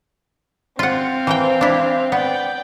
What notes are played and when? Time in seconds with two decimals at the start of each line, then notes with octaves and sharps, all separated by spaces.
0.79 C4 F4 F5 F#5
1.27 E3 A#4 G5
1.61 D4 E4
2.12 B3 D5 G5